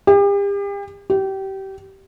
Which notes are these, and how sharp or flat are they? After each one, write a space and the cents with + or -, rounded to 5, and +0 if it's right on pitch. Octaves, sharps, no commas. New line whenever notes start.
G4 +40
G4 -25